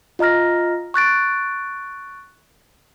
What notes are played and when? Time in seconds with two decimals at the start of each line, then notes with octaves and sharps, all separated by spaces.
0.19 F4 D#5 A#5 F6 A#6
0.94 C#6 F#6 A6 D7